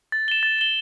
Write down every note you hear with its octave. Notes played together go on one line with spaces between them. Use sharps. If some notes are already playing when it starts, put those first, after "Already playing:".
A6
E7 G7
A6
E7 G7